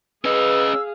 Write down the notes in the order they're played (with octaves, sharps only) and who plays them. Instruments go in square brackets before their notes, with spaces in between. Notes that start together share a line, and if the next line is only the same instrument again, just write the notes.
[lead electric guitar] C#4 D#5 [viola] G#4 F5 [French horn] B4 [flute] E6